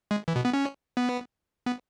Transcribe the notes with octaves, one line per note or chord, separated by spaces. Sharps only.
G#3
E3
B2
B3
C#4
B3
B3